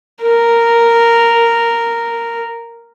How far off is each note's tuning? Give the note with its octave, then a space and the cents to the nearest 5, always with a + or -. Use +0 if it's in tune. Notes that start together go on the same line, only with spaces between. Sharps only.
A#4 -5